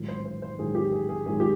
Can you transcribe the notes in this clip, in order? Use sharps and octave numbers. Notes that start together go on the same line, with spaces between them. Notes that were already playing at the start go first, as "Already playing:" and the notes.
Already playing: A1 G#2 D#3 F#3
C5
C5
C5
A1 G#2 D#3 F#3 G#4
G4
G#4
G#4
A1 G#2 D#3 F#3 G#4
G4